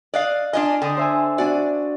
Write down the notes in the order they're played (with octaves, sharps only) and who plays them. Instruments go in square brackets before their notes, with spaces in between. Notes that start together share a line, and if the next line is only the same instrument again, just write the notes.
[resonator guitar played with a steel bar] D5 D#5 F5 [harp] F#6
[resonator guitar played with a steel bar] D4 F4 D#5 [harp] G#5
[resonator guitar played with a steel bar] D3 [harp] G5 D#6
[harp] C5 E5 G#5
[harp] D4 F#4 [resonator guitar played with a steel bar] D5 G#5